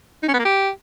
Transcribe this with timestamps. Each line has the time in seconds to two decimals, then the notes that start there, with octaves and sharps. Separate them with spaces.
0.23 D#4
0.28 C#4
0.34 B3
0.39 A#3
0.45 G4